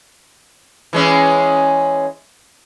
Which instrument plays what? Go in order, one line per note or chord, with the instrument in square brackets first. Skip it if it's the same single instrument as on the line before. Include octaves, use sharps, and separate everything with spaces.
[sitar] E3 G#3 C#4